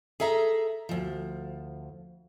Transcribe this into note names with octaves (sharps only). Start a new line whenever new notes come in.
G#4 A4 E5 A#5
D2 F3